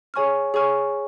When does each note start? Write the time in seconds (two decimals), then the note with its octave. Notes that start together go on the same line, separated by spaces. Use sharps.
0.14 G#4 C#5 G#5 C#6 F6
0.54 G#4 C#5 G#5 C#6 F6